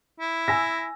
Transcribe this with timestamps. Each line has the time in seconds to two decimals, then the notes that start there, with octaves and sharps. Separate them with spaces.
0.20 E4
0.48 G#5 E6 A#6